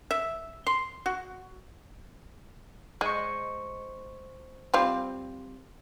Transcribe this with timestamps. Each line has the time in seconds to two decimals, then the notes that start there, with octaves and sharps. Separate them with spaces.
0.11 E5
0.67 C6
1.06 F#4
3.01 G#3 C5 D#5 C#6
4.74 G3 C4 F4